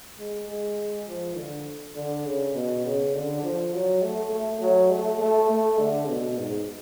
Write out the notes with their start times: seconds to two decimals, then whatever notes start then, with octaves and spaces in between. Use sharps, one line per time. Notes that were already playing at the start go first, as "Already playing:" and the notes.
0.19 G#3
0.48 G#3
1.07 F3
1.37 D3
1.96 D3
2.25 C#3
2.55 B2
2.85 C#3
3.14 D3
3.43 F3
3.73 F#3
4.02 A3
4.32 A3
4.61 F#3
4.91 A3
5.20 A3
5.49 A3
5.79 D3
6.09 B2
6.38 G#2